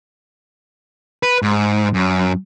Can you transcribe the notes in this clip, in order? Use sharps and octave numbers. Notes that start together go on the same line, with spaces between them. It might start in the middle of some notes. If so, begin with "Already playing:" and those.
B4
G#2
F#2